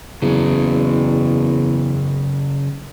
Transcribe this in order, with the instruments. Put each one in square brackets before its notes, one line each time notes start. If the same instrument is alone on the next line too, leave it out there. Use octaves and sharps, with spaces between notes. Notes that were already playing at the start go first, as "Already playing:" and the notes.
[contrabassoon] E2 [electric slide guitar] C#3 F#3